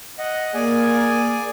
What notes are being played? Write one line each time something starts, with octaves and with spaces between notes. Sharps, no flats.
D#5 F#5
A#3 G#4 D5 G#5